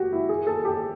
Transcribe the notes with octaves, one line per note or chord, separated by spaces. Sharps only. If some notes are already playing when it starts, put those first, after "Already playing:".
Already playing: F#4 G4
E4
G#4
A4
G4